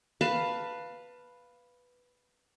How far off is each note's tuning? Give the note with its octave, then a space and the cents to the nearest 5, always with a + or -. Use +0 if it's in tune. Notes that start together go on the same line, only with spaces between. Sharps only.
B4 +0 F5 +0 A5 +25